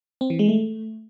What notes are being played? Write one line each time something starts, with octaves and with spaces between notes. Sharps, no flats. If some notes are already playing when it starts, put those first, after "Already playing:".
C4
E3
G#3
A3